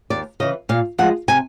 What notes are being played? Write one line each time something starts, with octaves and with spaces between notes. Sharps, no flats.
D#2 D5
C#3 E3 D#5
A#2 F5
F3 G#3 F#5
C3 G#5